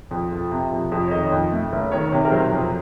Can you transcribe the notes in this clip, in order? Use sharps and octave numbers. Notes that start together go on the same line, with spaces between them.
F2
F3
C3
F2
F2
C#5
D#3 D#5
F2
A3
F#1
D#3 C#5
C3
A#4
F#3 C5
F2